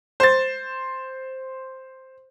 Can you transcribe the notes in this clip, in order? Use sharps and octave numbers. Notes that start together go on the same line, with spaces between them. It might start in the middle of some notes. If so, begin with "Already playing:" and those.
C5 A6